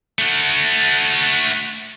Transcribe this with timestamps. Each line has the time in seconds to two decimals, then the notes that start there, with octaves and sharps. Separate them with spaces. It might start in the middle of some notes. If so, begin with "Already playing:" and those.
0.18 A3 F#4